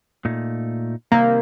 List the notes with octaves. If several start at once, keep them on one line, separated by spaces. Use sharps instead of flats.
A#2 A3 D#4
C3 D#3 G3 A#3 C4